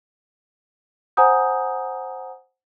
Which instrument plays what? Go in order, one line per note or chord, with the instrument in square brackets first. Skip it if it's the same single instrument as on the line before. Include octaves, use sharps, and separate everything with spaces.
[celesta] C5 F#5 G#5 A#5 D#6 G6